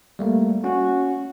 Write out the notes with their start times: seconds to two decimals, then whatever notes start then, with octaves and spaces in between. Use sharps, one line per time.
0.19 G3 A3 A#3
0.64 C#4 F#4